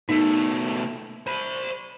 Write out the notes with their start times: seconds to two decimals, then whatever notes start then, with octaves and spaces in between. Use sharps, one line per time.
0.09 B2 A3 D#4
1.27 C5 B5